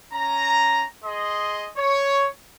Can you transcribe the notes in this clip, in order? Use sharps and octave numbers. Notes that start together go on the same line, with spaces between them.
C#4 A#5
G#4 D#5 C6
C#5